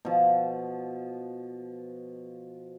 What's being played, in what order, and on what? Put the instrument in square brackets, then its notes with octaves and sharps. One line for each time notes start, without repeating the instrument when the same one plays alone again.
[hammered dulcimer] B2 F3